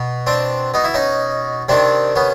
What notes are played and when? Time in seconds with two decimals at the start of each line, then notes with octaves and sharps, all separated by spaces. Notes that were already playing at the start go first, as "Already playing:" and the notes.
Already playing: B2
0.27 C4 D4
0.74 B2 D#4
0.84 E4
0.94 C#4 D#4
1.69 C3 D#3 C4 D4
2.16 B3 C#4